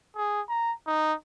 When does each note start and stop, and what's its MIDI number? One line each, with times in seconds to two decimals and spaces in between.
0.16 0.42 68
0.49 0.73 82
0.87 1.14 63